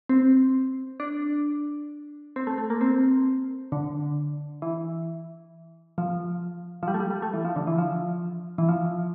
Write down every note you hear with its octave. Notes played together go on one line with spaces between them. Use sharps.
C4
D4
C4
A3
A3
A#3
C4
D3
E3
F3
F3
G3
A3
G3
G3
A3
E3
F3
D3
E3
F3
E3
F3